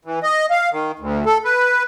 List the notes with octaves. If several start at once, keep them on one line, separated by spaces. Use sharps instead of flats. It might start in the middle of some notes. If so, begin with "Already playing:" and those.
E3
D#5
F5
D#3
D2
A4
B4